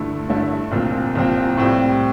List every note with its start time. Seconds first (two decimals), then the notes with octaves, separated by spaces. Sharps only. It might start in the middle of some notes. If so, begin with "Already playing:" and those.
Already playing: G2 D3 A3 E4 A4
0.28 G2 D3 A3 E4 A4
0.71 C2 A#2 F3 C4 F4
1.15 C2 A#2 F3 C4 F4
1.58 A2 G3 C4